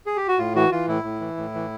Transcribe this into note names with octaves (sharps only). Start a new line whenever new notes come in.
G#4
G4
F#4
A2 F4
E3 F#4
E3 F4
A2 E4
A2
E3
A2
E3